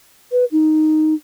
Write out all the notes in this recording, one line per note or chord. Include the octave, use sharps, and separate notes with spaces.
B4
D#4